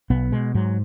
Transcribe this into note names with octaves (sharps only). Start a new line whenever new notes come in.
B1 B3
B2 G#3
G#2 F#3